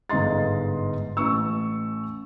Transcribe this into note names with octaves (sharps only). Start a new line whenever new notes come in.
G1 G#2 D#5 C6 A6
A1 C#6 E6